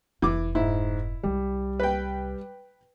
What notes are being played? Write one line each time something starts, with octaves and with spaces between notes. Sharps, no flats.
F1 E3 D6
G#2 E4
C2 C3 G3
B4 G5